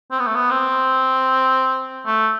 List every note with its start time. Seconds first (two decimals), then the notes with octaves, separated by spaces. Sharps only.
0.11 C4
0.19 B3
0.27 A3
0.35 B3
0.51 C4
2.06 A3